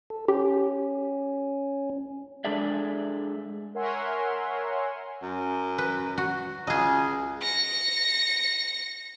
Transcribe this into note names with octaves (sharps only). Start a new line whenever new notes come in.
A4
C#4 G4
G#3 D4 G#4 A4 D5 E5
A#4 C#5 E5 F#5 G#5 C6
F#2
B4
F#4
C#2 G#4 D#5
A#6 C#7